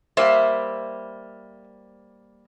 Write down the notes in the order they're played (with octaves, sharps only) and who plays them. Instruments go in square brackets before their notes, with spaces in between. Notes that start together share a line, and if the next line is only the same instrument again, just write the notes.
[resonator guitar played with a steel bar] G3 A#3 C5 [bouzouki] E5